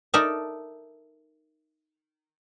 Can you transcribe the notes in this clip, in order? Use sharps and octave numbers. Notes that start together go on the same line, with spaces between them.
D#4 A4 A#4 D5 E5